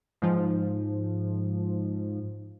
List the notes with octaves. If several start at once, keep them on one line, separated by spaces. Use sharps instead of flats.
G#2 F3